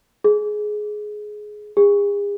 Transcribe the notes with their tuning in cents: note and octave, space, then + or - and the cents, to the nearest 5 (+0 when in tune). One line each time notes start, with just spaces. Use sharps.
G#4 +15
G#4 -40